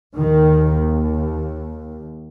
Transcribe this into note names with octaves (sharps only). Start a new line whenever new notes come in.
D#2 D#3